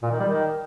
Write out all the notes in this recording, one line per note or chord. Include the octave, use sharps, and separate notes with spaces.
A#2
D#3
G3
D#3